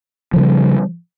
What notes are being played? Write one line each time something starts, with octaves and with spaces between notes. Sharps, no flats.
C#3 F3 G3